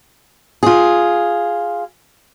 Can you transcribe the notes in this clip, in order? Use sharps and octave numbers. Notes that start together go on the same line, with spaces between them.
F4 G#4